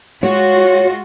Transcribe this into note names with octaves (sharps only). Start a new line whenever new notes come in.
G#3 F4 F#4 C#5